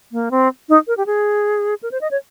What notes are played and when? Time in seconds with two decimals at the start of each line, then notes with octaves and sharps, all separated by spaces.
0.12 A#3
0.31 C4
0.69 D#4
0.87 A#4
0.97 G4
1.06 G#4
1.83 A#4
1.91 C5
2.01 D#5
2.11 C#5